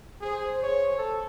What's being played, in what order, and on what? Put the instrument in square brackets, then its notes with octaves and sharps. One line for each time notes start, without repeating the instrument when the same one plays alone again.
[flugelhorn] G#4 [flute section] C5
[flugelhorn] C#5
A4